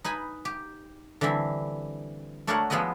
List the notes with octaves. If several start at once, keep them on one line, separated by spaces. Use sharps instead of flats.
D#4 B4 G#5 B5
G4
D3 E3 G3 C4 E4
A3 D4 F#4 A#4 C#5 F#5
F3 G#3 B3 E4 F#4 D#5